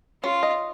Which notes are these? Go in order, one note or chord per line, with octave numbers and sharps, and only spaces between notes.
C#4 F4
D#5